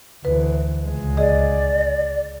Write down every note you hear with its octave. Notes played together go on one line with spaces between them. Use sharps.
D2 E3 B4
C#2 G#3
G#4 D5 D#5